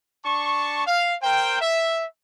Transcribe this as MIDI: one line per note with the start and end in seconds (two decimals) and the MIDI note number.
0.24 0.84 62
0.24 0.84 81
0.24 0.84 85
0.87 1.14 77
1.23 1.61 70
1.23 1.61 72
1.23 1.61 79
1.61 2.04 76